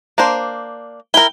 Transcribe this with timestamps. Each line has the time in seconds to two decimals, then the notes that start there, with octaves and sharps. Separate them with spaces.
0.18 A#3 D4 C5
1.14 E4 A#4 G5